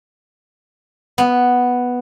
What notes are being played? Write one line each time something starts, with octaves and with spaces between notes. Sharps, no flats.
B3